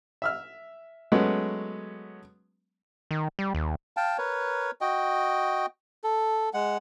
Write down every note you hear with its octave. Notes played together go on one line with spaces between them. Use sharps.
E5 E6 F6
F#3 G#3 A3 B3 C#4
D#3
G3
D#2
F5 G5 A5
A#4 B4 C#5
F#4 D#5 G5
A4
G#3 F#5